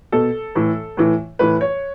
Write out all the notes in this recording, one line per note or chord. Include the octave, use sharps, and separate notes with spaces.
B2 A4
A2 E3
A2 E3
A2 E3 B4
C#5